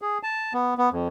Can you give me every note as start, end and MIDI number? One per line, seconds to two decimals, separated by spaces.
0.02 0.18 68
0.23 0.53 81
0.53 0.74 59
0.78 0.89 59
0.92 1.08 41